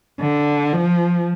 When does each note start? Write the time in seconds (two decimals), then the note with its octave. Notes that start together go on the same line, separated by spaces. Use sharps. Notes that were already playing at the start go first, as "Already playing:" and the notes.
0.20 D3
0.72 F3